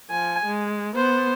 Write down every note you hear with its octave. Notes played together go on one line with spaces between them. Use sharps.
F3 G#5
G#3
B3 C5